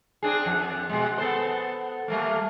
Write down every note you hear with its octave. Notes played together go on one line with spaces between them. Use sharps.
C4 D4 G#4
F2
B2 G#3
B3 A4 C5
G3 A3 A#3